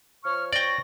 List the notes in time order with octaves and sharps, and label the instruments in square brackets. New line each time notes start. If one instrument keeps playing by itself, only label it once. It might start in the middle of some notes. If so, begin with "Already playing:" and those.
[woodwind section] F3 C#5 C#6 [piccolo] F6
[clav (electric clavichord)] D5 G5 [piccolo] A#6